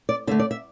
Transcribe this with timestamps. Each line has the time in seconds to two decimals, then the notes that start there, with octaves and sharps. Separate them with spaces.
0.09 D5
0.27 D3 E5
0.31 A3
0.39 D5
0.51 E5